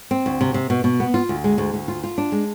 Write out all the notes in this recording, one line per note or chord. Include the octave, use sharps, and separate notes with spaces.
C4
D2
C3
C3
B2
B2
B3
F4
D2
G#3
D2
D2
F4
F4
D4
G#3